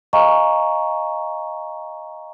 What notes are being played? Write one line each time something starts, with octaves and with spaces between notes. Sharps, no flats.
D#5 F5 G#5 A#5 C#6